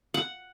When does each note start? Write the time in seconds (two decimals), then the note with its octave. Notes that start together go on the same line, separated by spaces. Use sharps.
0.14 F#5